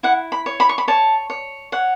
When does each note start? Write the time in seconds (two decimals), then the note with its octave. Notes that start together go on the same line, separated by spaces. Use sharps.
0.03 E4 F#5
0.32 B5
0.46 C#5
0.60 B5
0.69 C#6
0.78 B5
0.88 C#5 A5
1.30 C#5
1.72 C#5 F#5